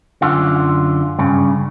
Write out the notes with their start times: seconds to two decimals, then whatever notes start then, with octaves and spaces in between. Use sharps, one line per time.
0.22 F#2 D3 F4
1.19 G2 C#3